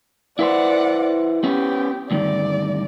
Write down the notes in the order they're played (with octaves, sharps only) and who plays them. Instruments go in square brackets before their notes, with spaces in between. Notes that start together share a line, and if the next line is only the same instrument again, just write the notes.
[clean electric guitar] E4 B4 C5 [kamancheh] D5 F#5
[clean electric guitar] B3 C#4 [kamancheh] G4
[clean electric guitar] D2 G2 D#3 [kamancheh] D5